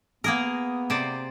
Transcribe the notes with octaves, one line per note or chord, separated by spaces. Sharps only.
A#3 B3 G#4 A#4
C3 C5 D5